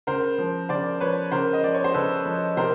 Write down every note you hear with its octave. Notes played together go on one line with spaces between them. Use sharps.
C#3 A#4 C5
F3
C#3 C5 D5
F3 B4 C#5
C#3 A#4 C5
D#5
F3 D5
C#5
C5
C#3 A4 B4
F3
C3 A#4 C5